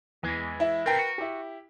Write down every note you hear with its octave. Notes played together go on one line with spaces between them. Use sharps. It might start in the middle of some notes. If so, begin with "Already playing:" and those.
E2 E3 G#3
E4 E5
C3 A3 C4 A#4 B4 G5
F#4
E4 G4